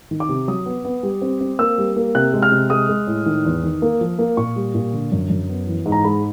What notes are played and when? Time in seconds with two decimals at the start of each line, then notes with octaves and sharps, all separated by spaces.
0.11 D#3
0.20 D6
0.29 C3
0.48 F#3 D#6
0.66 B3
0.85 B3
1.03 G3
1.22 C4
1.41 C4
1.59 A#3 E6
1.78 G3
1.96 A#3
2.15 C3 F#6
2.34 G#3
2.42 F6
2.52 C3
2.70 G#3 D#6
2.89 G#3
3.07 A2
3.26 D#3
3.45 E2
3.64 D#3
3.82 A#3
4.01 F3
4.19 A#3
4.37 A#2 C#6
4.56 G3
4.75 A#2
4.93 D3
5.12 F#2
5.30 F#2
5.49 B3
5.67 E3
5.86 G#2
5.92 A#5
6.04 G#3 B5